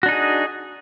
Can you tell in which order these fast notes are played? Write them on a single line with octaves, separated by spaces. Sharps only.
F#4 D4 D#4 G#4